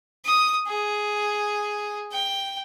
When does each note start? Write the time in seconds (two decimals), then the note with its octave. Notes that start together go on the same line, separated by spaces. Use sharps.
0.25 D#6
0.67 G#4
2.12 G5